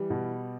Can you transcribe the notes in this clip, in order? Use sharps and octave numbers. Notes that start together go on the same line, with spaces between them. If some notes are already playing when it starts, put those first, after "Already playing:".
Already playing: E3 G3
B2